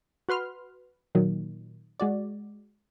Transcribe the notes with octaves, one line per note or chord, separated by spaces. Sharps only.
F#4 B4 C6 F6
A#2 D#3 F#3
G#3 F#4 D5